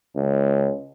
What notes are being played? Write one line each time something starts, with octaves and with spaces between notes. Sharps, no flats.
C#2